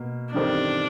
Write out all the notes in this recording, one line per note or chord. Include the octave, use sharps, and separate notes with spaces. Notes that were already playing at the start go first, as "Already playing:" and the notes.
Already playing: B2 A#3
A1 G2 D#3 G3 C4 D4